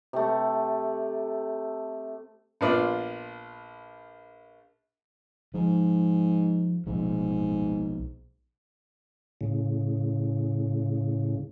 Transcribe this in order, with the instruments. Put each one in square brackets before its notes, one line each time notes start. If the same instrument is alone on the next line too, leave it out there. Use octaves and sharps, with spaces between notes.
[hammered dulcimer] C3 A3
[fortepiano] A#1 B3 F4 D5
[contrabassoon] G#2 [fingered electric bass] F3
[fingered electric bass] B1 B2 F3 [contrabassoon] G#2
[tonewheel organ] A2 C#3